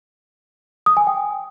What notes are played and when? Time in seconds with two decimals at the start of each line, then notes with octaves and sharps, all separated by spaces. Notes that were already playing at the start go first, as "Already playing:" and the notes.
0.86 D#6
0.97 G#5
1.07 G5